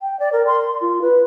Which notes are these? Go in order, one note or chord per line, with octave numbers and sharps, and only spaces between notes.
G5
D5
A#4
C6
C6
F4
B4